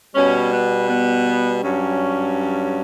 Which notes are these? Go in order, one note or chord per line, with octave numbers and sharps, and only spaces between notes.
B2 G3 C#4
B3
B3
G2 F#3 C#4